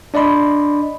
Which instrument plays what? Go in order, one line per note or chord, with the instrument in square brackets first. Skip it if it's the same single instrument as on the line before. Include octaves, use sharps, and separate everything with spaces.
[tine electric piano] D4 D5 D#5 B5 C6